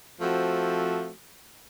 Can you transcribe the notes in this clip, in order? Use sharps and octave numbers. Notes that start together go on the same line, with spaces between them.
F3 A3 C4 F#4